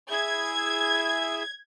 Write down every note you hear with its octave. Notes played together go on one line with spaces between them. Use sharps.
E4 G#4 E5 G#6